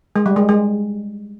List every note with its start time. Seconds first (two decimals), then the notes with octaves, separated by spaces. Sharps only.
0.16 G#3
0.26 G3
0.36 G#3
0.49 G#3